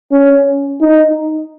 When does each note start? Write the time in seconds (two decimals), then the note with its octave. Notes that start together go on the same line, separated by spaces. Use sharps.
0.12 C#4
0.81 D#4